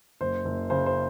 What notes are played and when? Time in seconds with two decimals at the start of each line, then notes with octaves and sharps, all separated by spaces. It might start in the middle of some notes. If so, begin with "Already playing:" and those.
0.21 F#1 C5
0.45 F#1
0.70 C#3 C5
0.86 C5